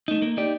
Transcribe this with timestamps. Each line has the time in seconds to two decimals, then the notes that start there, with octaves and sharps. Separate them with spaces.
0.08 A3 D#4
0.22 A#3
0.37 D#4 G4 D5